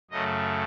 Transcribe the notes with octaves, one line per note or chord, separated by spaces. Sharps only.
F#2 C#3 A3 D#5